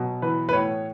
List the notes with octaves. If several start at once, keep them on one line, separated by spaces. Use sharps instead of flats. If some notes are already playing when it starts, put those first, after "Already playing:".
Already playing: B2 F#3
E3 B4
B4
A2 C#5